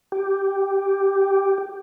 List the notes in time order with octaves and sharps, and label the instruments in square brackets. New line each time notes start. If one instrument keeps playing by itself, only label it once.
[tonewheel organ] G4